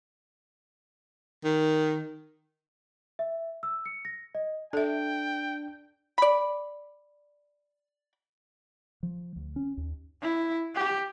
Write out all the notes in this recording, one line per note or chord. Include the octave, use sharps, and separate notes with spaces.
D#3
E5
E6
C#7
A#6
D#5
D4 A4 E5 G5
D5 B5
F3
D2
C#4
D#2
E4
G4